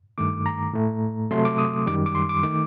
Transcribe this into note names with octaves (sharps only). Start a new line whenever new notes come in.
G2 D#3 A3 D6
A#5
A2 A3
C3 F#3 A3 C6
D6
D#6
F#2 D#3 G3 D6
D6
C6
D6
D#3 A3 D6